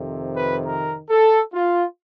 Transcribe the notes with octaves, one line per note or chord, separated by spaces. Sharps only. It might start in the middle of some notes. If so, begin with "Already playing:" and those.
Already playing: F2 C3 D#3
B4
A#4
A4
F4